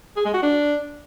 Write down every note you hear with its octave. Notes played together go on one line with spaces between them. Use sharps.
G#4
G#3
F#4
D4